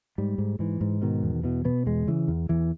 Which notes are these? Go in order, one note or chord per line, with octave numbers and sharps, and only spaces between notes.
G#2 G3
G#2
G#2 E3
G#2
B2 D#3
E2
B2 E3
B2 B3
E2 G#3
C#3 E3
E2
E2 E3